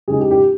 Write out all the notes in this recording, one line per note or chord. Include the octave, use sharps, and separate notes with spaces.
C#3 G#3 D#4 G#4
G4
G4